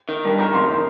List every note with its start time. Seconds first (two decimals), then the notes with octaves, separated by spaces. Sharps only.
0.09 D#3
0.25 G2
0.39 D#3 A#5
0.54 F2 C6